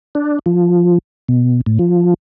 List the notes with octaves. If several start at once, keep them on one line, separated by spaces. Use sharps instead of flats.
D4
F3
B2
A2
F3